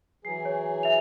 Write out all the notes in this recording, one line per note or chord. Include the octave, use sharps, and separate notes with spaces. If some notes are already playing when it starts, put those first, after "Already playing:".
E3 F#3 G#4 C7
C#5
E5 F7